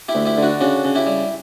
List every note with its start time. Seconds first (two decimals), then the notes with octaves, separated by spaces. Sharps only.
0.09 E4 G4
0.15 D2
0.25 E4 G4
0.37 D3
0.43 D4 F#4
0.60 C#3 D4 F#4
0.84 C#3
0.95 E4 G4
1.06 G3